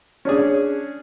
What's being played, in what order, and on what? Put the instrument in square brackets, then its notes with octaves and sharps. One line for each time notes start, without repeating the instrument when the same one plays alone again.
[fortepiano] C#4 D4 G#4